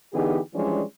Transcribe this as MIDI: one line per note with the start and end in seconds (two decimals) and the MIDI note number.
0.13 0.39 50
0.13 0.39 52
0.13 0.39 59
0.13 0.39 63
0.13 0.39 67
0.13 0.39 68
0.54 0.82 52
0.54 0.82 53
0.54 0.82 55
0.54 0.82 56
0.54 0.82 61
0.54 0.82 62